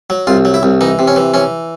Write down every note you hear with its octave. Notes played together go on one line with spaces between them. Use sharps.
F#3
C2 F4
F#3
E4
C2
E3 D#4
C3
C#4
E3
E3 C#4